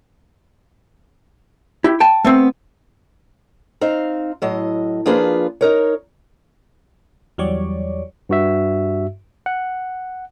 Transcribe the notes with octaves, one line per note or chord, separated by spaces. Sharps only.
E4 G4
G5 A5
A3 B3 C4
C4 D#4 F5
A2 F#3 D#5
F3 A#3 D4 F4 G#4 B4
D#4 A#4 C#5
E2 F#3 G3 C#5 D5
G2 F#4 E5
F#5